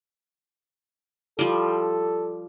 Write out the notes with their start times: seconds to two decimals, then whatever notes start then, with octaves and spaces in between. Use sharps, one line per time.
1.39 F3 G3 A4